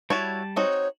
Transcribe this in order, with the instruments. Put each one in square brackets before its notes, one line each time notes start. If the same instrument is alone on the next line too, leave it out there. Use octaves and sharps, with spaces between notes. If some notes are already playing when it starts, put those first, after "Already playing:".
[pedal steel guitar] G3 A5 [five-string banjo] E4 F#4 C#5
[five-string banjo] C4 D#4 F#4 [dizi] C#5